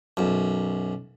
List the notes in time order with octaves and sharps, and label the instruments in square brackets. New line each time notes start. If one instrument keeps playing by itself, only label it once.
[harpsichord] B1 F#2